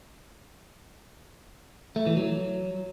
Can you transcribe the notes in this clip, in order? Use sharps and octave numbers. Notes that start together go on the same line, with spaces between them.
A3
E3
F#3